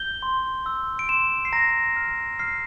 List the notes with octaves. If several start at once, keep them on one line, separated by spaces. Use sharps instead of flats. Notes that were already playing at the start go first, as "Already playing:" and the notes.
Already playing: G6 G7
C6
E6
D7
C6 E7
C7
A#5 A#6
F6
F6 C7